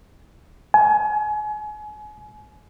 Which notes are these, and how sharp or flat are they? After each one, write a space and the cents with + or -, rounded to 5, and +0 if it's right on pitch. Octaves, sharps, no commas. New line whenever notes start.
G#5 +30